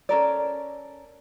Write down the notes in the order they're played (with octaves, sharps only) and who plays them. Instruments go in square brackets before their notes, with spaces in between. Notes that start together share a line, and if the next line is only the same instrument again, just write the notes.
[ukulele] C#4 A4 A#4 D5